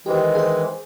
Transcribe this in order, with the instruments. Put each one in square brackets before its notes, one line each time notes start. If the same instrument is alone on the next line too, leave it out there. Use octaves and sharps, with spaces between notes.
[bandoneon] D#3 E3 G#3 [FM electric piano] G4 C5
[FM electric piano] G#4 C5